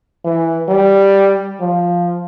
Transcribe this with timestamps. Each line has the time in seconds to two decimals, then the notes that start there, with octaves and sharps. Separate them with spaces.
0.25 E3
0.69 G3
1.61 F3